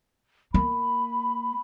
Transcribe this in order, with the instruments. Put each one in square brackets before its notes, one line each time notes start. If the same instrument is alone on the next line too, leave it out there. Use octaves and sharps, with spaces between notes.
[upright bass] A#3 [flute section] B5